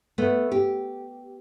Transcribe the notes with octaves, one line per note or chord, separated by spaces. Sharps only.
A3 B3
G4